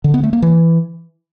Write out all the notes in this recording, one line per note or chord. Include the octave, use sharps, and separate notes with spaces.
D3
B3
A3
A#3
E3